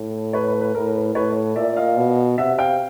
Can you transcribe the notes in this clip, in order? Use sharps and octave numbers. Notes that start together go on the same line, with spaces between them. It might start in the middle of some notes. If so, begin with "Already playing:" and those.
Already playing: A2
B4 C#5
B4
B4
A2 A#4
B4
A2 B4 C#5
A#2 D5 E5
D#5 F5
B2
C3 E5 F#5
F5 G5